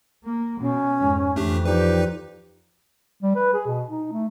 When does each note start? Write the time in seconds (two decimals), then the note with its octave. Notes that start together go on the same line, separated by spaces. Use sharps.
0.24 A#3
0.60 B2 C#4
1.00 F2 G#2
1.36 F2 E3 A3 D4 G4
1.66 F3 D#4 G4 B4 D5
3.23 G3
3.36 B4
3.54 G#4
3.66 B2
3.90 D#4
4.12 A3